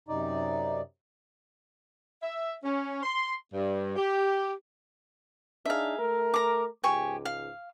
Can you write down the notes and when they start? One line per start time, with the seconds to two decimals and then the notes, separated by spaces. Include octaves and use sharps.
0.08 F#2 C3 D#4 D5
2.21 E5
2.63 C#4
3.03 C6
3.53 G2
3.96 G4
5.65 D4 D#4 G#4 E5 F5
5.99 A3 A#4
6.34 A#5 D6
6.84 C#2 G#2 G4 G#5 C#6
7.25 F5